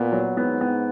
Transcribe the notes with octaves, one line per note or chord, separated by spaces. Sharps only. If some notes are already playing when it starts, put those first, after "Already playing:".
Already playing: A#2 B3
F#3
G#2 B3
B3